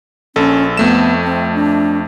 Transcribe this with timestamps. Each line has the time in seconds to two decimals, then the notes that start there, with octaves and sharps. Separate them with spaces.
0.36 A#1 C#4 A4
0.77 F2 A3 B3 E7
1.24 C4
1.54 D4